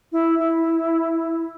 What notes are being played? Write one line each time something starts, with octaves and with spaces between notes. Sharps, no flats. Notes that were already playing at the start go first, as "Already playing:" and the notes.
E4
E4